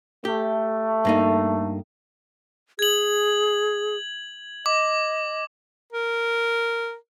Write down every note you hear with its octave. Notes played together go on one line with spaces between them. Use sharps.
A3 G4
G2 A#3 D#4
G#4 G#6 F#7
D#5 D6
A#4